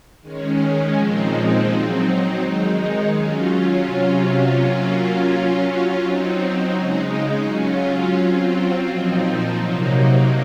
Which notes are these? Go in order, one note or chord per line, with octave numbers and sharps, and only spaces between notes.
D#3 G#3 C#4
A#2 F3 G#3 C4 D#4
F#3 C4 D#4
D#3 G#3 D#4
F#3 C#4 F4
C3 F#3 C#4 F4
F#3 A#3 C#4 F4
F#3 C#4 F4
F#3 C4 D#4
C#3 G#3 D#4
F#3 C#4 F4
F#3 C4 F4
A#2 F3 C4 D#4
C3 F#3 A#3 D#4